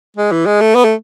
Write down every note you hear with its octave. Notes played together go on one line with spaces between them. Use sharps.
G#3
E3
G#3
A3
B3
A3